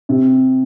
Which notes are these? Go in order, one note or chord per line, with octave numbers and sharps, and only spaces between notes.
C3